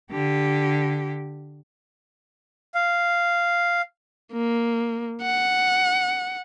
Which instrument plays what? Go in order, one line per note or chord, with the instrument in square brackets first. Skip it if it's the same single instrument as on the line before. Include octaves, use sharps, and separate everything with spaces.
[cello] D3 G4
[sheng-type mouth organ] F5
[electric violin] A#3
F#5